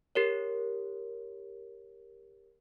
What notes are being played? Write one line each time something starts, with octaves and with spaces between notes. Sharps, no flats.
G4 A#4 C#5